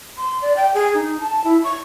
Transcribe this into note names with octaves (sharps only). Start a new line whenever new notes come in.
C6
D5
G5
G#4
D#4
A5
E4
C#6